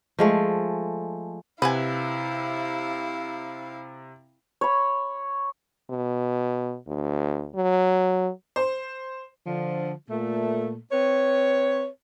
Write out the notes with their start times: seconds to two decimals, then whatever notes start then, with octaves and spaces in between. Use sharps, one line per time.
0.19 F3 G#3 A3
1.62 C3 E4 B4 F5 F#5 G#5
4.61 C#5 B5
5.90 B2
6.87 D2
7.55 F#3
8.56 C5
9.46 D3 F3
10.10 A#2 A3
10.92 C4 B4 C#5